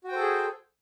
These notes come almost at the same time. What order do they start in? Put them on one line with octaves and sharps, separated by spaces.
F#4 G5 C5 A4 G#4